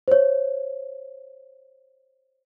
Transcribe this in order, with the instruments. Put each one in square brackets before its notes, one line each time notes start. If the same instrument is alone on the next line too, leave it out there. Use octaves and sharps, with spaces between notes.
[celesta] C5 C#5